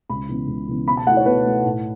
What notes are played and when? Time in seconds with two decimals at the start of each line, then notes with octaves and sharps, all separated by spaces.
0.09 C#2 B5
0.29 C#3 E3 B3
0.48 C#2
0.68 C#3 E3 B3
0.87 B2 B5
0.97 A5
1.07 A3 F#5
1.11 E4
1.17 C#5
1.26 B2 B4
1.46 A3 E4
1.65 A2